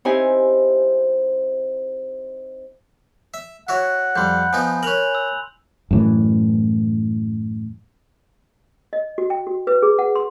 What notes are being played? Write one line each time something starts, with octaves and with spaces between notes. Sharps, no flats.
C4 D#4 E4 G4 C5 G#5
E5
E4 F#4 C#5 F#5
F2 G3 B5 C6 G6
F3 B3 D#4 G#5
C#4 A#4 F#6 F7 F#7
E6
F#2 A2 E3
D#5
F#4
G5
F#4
B4
G#4
F#5
C6